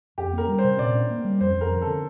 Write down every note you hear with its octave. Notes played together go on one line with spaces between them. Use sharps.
F2 G4
A#3 A#4
G3
C5
C3
A#2 D5
D4
A#3
G3
F2 C5
F2 A#4
F3
A4
D3